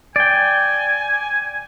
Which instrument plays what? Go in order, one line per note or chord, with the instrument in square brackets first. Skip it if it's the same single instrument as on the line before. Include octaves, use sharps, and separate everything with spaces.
[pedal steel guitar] D5 G5 [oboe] G#5